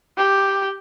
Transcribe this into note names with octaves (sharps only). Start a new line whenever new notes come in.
G4